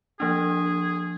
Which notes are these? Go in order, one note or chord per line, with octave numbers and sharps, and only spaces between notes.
F3 A#3 D4 G#4